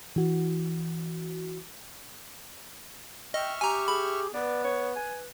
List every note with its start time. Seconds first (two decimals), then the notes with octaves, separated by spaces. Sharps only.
0.16 E3 F#4
3.34 D#5 E5 G5 C#6 F6
3.61 G4 G#5 A#5
3.88 G#4 B5
4.34 B3 B4 D5
4.64 C#5
4.96 G#5